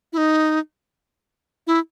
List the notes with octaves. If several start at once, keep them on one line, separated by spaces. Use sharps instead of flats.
E4
D#4
E4